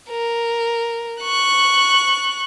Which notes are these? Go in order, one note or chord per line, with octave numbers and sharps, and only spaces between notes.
A#4
C#6 F#6